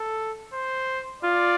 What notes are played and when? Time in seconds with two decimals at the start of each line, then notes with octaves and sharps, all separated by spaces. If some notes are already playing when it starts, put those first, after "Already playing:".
Already playing: A4
0.53 C5
1.22 F4 D5